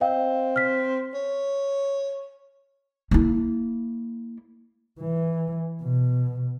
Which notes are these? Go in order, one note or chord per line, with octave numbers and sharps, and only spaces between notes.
C4 D#5 F5 G5
F6 B6
C#5
A#3 E4
E3
B2